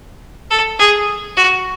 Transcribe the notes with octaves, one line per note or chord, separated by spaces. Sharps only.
A4
G#4
F#4